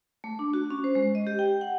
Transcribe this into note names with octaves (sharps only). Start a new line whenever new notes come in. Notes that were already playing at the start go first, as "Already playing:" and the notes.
A3
D4
F#4
C#4
C5
G#3
D#5
G4
G5
F#5